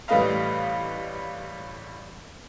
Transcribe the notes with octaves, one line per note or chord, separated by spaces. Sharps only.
A1 G3 A3 B4 D#5 F5